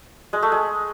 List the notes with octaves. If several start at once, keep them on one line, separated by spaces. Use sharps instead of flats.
G#3
A3
G#3